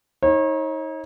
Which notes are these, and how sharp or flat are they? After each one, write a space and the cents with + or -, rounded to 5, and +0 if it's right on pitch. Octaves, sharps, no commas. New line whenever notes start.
D#4 +30 C#5 -35